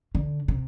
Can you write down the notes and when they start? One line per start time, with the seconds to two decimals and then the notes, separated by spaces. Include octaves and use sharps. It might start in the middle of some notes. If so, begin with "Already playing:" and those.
0.15 D3
0.48 C3